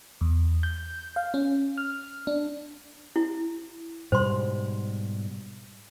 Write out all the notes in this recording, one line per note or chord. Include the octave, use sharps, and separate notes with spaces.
E2
G6
F5
C#4
F6
D4
E4
G#2 B2 G3 C5 C6